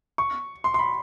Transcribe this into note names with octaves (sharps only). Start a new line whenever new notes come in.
C#6
C6
C6
B5